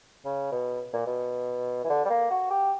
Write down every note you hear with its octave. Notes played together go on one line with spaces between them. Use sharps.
C#3
B2
A#2
B2
E3
D3
G3
A#3
F#4
G4